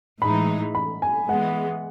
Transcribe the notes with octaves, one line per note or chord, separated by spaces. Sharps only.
A2 E3 G#3 D#4 B5
B5
G#5
E3 G#3 B3 F#5